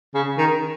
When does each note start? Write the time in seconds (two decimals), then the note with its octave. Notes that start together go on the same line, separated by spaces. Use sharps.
0.14 C#3
0.38 D#3